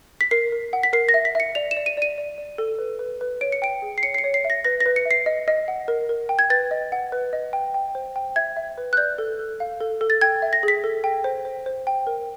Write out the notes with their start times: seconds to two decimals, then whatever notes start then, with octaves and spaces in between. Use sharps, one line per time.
0.21 B6
0.31 A#4 C7
0.52 A#4
0.73 F#5
0.83 B6
0.93 A#4 C7
1.09 A#6
1.14 E5
1.25 B6
1.35 E5 C#7
1.55 D5 F7
1.71 E7
1.77 D5
1.86 D#7
1.97 D5 D#7
2.18 D5
2.38 D5
2.58 A4
2.79 B4
2.99 B4
3.21 B4
3.41 C#5 D7
3.52 C#7
3.62 G5 D7
3.82 G#4
3.98 C7
4.03 C#5 C#7
4.14 C7
4.18 C#7
4.24 C#5
4.34 C7
4.44 E5
4.50 A#6
4.65 B4 A#6
4.80 A#6
4.86 B4
4.96 C#7
5.05 E5
5.11 C7
5.26 D#5
5.48 D#5
5.68 F#5
5.88 A#4
6.09 A#4
6.29 G5
6.39 G#6
6.50 B4 A6
6.71 D#5
6.92 F#5
7.12 B4
7.33 D#5
7.53 G5
7.74 G5
7.95 C5
8.16 G5
8.36 E5 G#6
8.57 E5
8.78 B4
8.93 F#6
8.97 D5 G6
9.18 A4
9.39 A4
9.60 F5
9.81 A4
10.01 A4
10.10 A6
10.21 G5 G#6
10.42 E5
10.53 A#6
10.63 G#4
10.68 B6
10.84 A4
11.04 G5
11.24 C5
11.45 C5
11.66 C5
11.87 G5
12.07 A#4